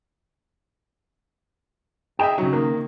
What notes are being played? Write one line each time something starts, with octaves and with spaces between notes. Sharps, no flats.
G#4 D#5 E5 G5
C#3 F#3 D#4
D#3 A#3